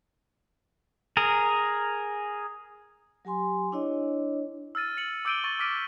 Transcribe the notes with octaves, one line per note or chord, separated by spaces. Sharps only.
G#4 A#4
F#3 G4 G#5 C6
D4 E4 C#5 D#5
E6 F6 A6 D#7
C#7 F#7
D6 E6 G6 D7 D#7 G7
C#6 A6
D6 F6 B6 D7 D#7